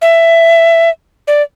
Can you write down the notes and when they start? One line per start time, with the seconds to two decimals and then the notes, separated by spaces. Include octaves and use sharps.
0.02 E5
1.28 D5